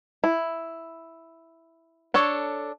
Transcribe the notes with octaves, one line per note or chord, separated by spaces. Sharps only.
E4
D4 A4 C#5